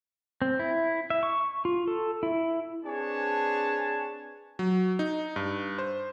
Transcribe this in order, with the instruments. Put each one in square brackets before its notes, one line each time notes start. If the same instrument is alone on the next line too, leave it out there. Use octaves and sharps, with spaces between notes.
[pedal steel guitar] C4
E4
E5
C#6
F4
A4
E4
[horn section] C4 D4 G#4 B4 C#5 A5
[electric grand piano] F#3
D#4
G2
C5